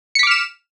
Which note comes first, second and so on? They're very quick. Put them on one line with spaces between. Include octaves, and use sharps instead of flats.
C#7 B6 D6 F6 E7